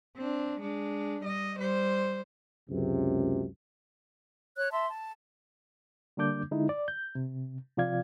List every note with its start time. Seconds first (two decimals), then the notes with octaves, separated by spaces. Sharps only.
0.17 C4 D4
0.60 G#3 D4
1.21 G3 D#5
1.58 G3 C5
2.69 C#2 F#2 C3
4.57 C#5 F#6
4.71 E5 A5 C6
4.90 A5
6.17 D3 G3 A#3 D4 D6 G6
6.51 D3 G#3 D#4 E4
6.69 D5
6.88 G6
7.15 C3
7.77 C3 F3 F4 D5 F5 G#6